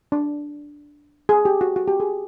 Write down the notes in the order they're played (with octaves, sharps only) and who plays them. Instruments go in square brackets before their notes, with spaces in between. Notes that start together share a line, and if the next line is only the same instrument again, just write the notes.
[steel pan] D4
G#4
G4
F#4
F#4
G4
G#4